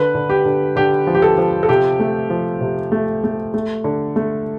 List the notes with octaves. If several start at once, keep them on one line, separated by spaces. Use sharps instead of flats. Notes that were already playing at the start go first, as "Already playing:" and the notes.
Already playing: D3 B4
D3
G4
D3
D3 G4
F3
G4
A4
F3
A4
C3 G4
A3
F3
C3
A3
A3
A3
D3
A3